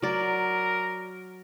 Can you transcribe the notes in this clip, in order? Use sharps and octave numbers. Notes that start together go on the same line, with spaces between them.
F#3 A#4 D5